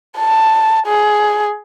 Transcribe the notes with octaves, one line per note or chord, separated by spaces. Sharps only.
A5
G#4